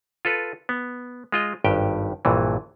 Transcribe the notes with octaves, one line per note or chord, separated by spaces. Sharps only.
F4 A4 B4
B3
G#3 F4 D#5
G#1 G2 G4 G5
A#1 G2 A#2 E3